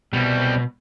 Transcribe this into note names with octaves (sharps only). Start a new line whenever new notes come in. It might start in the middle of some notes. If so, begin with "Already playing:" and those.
C2 B2 G3